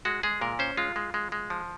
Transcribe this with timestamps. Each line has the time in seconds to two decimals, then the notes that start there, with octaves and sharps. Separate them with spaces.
0.05 G#3 F#4
0.23 G#3 G#4
0.41 A#2 A#4
0.59 C#4 C5
0.77 G#3 F4
0.96 G#3
1.14 G#3
1.32 G#3
1.50 F3